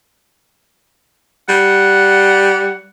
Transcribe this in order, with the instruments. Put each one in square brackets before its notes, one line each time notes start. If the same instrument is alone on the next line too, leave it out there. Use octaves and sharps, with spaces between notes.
[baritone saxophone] G3 [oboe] F#5